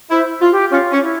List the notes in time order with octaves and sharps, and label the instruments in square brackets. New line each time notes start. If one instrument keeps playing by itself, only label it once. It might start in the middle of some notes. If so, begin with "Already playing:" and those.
[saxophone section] E4 [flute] C5
[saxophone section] F4
[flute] G4
[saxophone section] C#4 [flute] F4
[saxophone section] C#4
[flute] E4